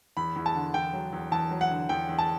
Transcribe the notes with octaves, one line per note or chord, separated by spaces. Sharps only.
E2 B5
E2
A5
D3
E2 G5
F#3
E2
E2 A5
F#3
F#5
D3
E2 G5
E2
A5